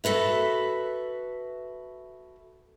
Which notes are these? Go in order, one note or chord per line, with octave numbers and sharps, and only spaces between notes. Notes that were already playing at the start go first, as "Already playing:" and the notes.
F#4 A4 B4 E5